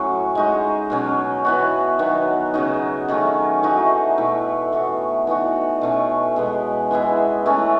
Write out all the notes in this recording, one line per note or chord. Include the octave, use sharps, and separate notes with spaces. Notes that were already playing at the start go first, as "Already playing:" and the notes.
Already playing: A2 F#3 C#4 F#4
G#3 D#4 F#4
B2 F#3 C#4
E3 B3 F#4
D#3 F#3 B3
C#3 F#3 B3 D#4
D#3 F#3 A3 C#4
E3 A3 D#4 F#4
B2 A3 E4
E3 B3 F#4
E3 B3 D#4 F#4
B2 A3 C#4
B2 G#3 B3
E3 G#3 B3 E4
E3 A3 C#4